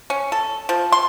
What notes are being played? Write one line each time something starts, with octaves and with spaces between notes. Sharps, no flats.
C#4
A4
F3
C6